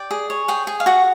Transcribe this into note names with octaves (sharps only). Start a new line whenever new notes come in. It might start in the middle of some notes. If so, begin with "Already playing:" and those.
Already playing: D5 G5
G#4
C#5
G#4 G5
G#4
F5
F#4 F#5